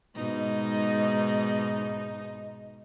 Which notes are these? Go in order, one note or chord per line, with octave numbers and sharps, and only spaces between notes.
G#2 B2 D#4